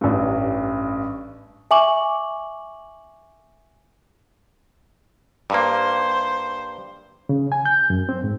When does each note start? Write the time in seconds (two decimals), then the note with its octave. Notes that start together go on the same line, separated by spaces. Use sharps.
0.01 A1 G2
1.71 E5 G#5 C#6 D6 F#7
5.50 G2 A#3 C5
7.29 C#3
7.52 G#5
7.66 G6
7.90 F#2
8.09 C4
8.24 G#2